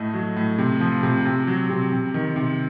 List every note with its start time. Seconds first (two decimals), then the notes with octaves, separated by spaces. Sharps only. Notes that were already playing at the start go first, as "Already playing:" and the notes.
Already playing: A2 A3 D#5
0.14 F#3
0.37 A2
0.58 C3
0.80 F3
1.03 C3
1.25 C3
1.47 F#3
1.70 C3
1.92 C3
2.14 D#3
2.36 C3